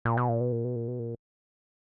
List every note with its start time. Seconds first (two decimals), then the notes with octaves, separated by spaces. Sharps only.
0.05 A#2
0.17 B2
0.29 A#2
0.41 B2
0.52 A#2
0.65 B2
0.76 A#2
0.88 B2
0.99 A#2